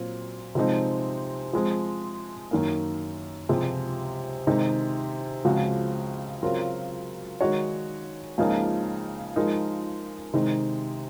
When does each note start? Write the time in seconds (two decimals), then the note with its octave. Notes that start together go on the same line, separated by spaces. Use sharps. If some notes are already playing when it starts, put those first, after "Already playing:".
Already playing: A#2 F#3 C4
0.55 C3 F3 G#3 C4 D#4
1.53 F3 G#3 C4
2.51 F#2 D#3 A#3
3.49 C#2 C3 F3 G#3
4.47 C3 D#3 G#3 D#4
5.45 C#2 C#3 F3 C4 F#4
6.42 C#3 F#3 C4 F4 A#4
7.41 D#3 G#3 D#4 F#4 C#5
8.38 C#2 C#3 F3 A#3 D#4
9.36 F3 G#3 D#4 A#4
10.34 C3 D#3 G#3 D#4